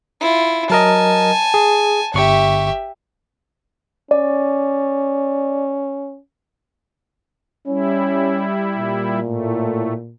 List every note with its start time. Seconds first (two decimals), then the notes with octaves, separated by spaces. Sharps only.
0.21 E4 F4
0.70 F#3 A#4 D#5 G#5 A5
1.54 G#4
2.14 G1 G4 E5 C#6
4.11 C#4 D5
7.67 G3 C#4 E4
8.78 A#2
9.22 A2 A3